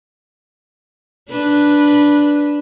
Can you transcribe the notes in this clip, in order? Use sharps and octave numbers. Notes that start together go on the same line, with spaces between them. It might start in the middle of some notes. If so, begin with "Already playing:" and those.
D4 B4